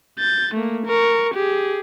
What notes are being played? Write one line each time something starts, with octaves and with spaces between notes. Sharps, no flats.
G6 A6
A3 A#3
A#4 C#6
G4 G#4